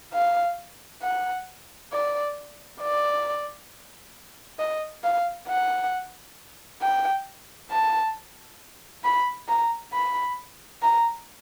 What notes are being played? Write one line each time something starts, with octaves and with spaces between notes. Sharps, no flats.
F5
F#5
D5
D5
D#5
F5
F#5
G5
A5
B5
A#5
B5
A#5